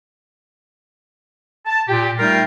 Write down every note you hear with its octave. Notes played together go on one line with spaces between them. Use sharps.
A5
A#2 G4
G3 A3 D#4 F4 A#4 G5